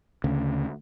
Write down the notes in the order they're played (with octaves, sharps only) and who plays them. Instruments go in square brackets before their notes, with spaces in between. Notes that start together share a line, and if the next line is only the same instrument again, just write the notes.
[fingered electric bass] D2 C#3